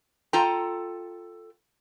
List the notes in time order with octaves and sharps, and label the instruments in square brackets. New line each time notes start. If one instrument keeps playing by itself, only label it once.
[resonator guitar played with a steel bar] F4 A4 G5 A#5